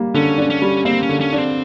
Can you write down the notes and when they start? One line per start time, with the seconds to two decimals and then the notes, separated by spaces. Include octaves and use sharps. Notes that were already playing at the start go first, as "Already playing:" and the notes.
Already playing: G3 A#3
0.14 D3 C#4
0.38 D4
0.50 C#4
0.62 G3
0.85 A#3 C4
1.03 C#4
1.09 D3
1.21 C#4
1.33 D4
1.38 C4